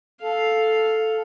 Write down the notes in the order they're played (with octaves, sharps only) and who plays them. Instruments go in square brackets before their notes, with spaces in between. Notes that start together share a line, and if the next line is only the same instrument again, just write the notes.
[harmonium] A4 [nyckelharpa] F5